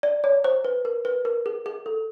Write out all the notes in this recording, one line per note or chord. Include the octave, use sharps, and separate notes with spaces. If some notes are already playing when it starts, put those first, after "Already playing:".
D5
C#5
C5
B4
A#4
B4
A#4
G#4
G#4
A4